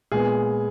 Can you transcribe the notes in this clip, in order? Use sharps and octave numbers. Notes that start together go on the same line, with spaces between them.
A#2 G#3 B3 G#4